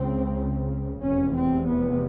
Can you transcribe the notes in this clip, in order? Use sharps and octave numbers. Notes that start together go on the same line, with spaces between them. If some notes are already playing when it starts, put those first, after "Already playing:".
Already playing: C#2 C#3 C4
F1 E2 C3 C#4
C4
B3